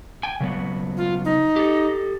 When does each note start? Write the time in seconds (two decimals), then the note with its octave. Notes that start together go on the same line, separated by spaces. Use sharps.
0.23 G5 G#5
0.40 C#3 F#3 B3
0.97 F4
1.25 D#4
1.56 G4 A4